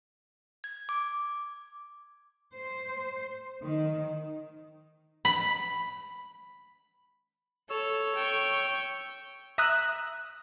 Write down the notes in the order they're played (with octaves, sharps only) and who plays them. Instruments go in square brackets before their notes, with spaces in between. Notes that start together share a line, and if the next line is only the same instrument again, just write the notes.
[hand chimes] G#6
D6
[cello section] C5
D#3
[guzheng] B5
[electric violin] A4 [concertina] C#5 E6
[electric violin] G5 C#6
[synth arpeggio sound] E5 A#5 D#6 E6 F#6